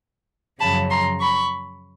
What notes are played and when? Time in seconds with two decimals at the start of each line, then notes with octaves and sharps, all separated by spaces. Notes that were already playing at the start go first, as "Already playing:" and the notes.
0.59 F#2 C#3 F3 A5 B5
0.90 A#5 C6
1.20 B5 C#6